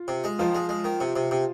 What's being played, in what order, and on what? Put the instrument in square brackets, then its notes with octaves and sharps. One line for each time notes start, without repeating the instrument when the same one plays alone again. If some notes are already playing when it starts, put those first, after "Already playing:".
Already playing: [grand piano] F4
[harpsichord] C3
G#3
[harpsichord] D#3 [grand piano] F3 F4
[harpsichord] G#3
G#3
D#3
C3
C3
C3